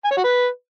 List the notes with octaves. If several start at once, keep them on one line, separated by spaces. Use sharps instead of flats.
G#5
C#5
F#4
B4